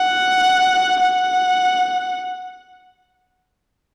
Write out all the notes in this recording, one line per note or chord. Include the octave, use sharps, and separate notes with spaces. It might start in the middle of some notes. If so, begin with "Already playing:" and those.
Already playing: F#5
F#5